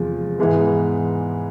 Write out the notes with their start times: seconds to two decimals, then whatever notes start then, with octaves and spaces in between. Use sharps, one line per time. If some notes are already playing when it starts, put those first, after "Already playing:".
Already playing: E2 C3 F3 G#3
0.39 G#2 E3 G#3 B3